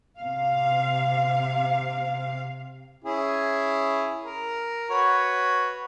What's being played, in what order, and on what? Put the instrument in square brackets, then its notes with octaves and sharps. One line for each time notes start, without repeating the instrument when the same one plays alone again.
[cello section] C3 F5
[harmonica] C#4 E4 G#4
A#4
F#4 B4 C#5